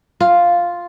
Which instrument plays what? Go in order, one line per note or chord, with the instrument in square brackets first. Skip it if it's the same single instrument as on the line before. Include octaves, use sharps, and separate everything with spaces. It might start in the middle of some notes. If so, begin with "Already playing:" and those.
[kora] F4